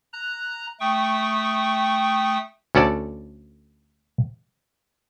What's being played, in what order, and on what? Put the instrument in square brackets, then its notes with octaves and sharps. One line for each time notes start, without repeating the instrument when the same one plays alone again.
[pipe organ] A#5 F#6
A3 G5 C#6 D#6
[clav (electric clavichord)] D2 C#4 A4 D5 A5